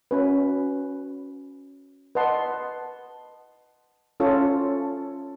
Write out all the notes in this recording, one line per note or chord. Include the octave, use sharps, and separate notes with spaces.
C#4 F#4 B4
B4 D#5 F#5 A5 C6
C#4 F4 A4 C#5